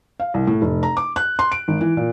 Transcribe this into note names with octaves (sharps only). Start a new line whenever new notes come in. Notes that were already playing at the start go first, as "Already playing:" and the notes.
F5
C2
A2
F1
A#5
D6
F#6
C6
D7
G#1
E3
A#2